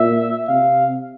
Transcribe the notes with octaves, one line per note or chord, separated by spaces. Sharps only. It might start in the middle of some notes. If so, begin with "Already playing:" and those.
Already playing: A#2 E5
C3 F5